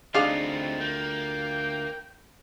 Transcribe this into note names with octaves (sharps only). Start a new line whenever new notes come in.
D2 C4 D4 D#4 F4 G#4 F5
A#3 G5